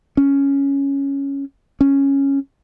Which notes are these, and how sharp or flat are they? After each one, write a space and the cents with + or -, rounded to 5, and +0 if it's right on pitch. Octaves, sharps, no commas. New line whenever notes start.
C#4 +0
C#4 -5